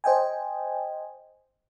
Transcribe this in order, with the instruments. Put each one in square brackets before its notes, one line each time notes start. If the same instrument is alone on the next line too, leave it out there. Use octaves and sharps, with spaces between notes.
[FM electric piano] C5 D#5 G5 G#5